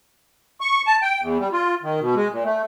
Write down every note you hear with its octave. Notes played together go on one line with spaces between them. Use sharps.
C#6
A5
G5
E2
G3
F4
D#3
B2
G#3
A#2
A3